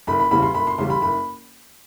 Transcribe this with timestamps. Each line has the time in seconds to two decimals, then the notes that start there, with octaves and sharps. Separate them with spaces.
0.07 F#1 B5
0.20 B5
0.31 E2 C#3 E3 G3 B5
0.43 C6
0.54 F#1 B5
0.67 C6
0.78 E2 C#3 E3 G3 C6
0.90 B5
1.02 F#1 B5